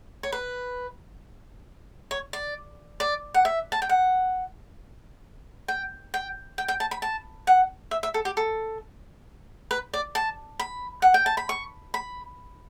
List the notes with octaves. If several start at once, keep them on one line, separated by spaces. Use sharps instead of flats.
C#5
B4
C#5
D5
D5
F#5
E5
A5
G5
F#5
G5
G5
G5
G5
A5
B5
A5
F#5
E5
E5
A4
G4
A4
B4
D5
A5
B5
F#5
G5
A5
B5
C#6
B5